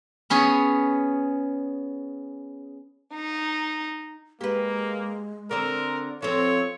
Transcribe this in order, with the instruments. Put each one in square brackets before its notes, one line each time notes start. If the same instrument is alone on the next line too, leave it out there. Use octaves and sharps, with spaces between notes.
[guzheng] B3 C#4 G#4
[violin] D#4
[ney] G#3 [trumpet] A#3 [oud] G4 B4
[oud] D3 C4 [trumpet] A#4
[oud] F3 C4 [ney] A4 [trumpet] C#5